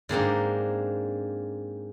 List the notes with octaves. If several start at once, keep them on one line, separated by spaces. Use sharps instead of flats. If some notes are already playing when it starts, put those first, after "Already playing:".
G#2 A#3 C4 D4